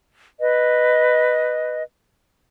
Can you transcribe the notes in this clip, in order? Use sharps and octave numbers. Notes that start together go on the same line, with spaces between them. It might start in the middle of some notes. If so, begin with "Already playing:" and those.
B4 D#5